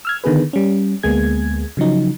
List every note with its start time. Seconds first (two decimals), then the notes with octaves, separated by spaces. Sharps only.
0.05 E6 F6 G#6
0.24 D3 D#3 B3 G#4 B4
0.53 G3 C#4
1.03 D2 G#3 A#3 B3 G#4 G#6
1.77 C#3 F3 F#3 D#4